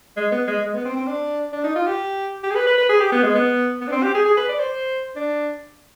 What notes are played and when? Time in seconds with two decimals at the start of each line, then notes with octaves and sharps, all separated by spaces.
0.17 G#3
0.32 B3
0.47 G#3
0.63 G#3
0.74 B3
0.85 C4
0.96 C4
1.07 D4
1.53 D4
1.64 D#4
1.76 F4
1.87 G4
2.43 G4
2.51 G#4
2.55 B4
2.67 B4
2.78 B4
2.89 G#4
3.00 G4
3.12 B3
3.23 G#3
3.35 B3
3.81 B3
3.88 D4
3.92 C4
4.03 G4
4.14 G#4
4.25 G#4
4.37 B4
4.49 D5
4.59 C5
5.16 D4